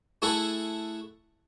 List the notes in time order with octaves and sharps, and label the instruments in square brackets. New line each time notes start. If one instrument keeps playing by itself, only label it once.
[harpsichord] A3 E4 G#4 A4 F#5